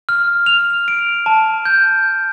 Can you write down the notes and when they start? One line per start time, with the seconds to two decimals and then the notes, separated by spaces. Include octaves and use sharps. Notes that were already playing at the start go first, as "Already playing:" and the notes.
0.09 F6
0.46 F7
0.88 D7
1.26 A5
1.65 G6